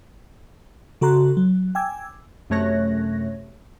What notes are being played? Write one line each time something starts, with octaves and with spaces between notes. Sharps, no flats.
C#3 F#4 A4 A#5 C6 F#6
F#3
G5 G#5 D6 E6 G#6
F#2 C3 A3 C#5 F#6 A#6